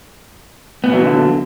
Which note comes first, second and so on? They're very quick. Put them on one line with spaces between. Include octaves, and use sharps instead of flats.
B3 A#2 F#3 E3 D3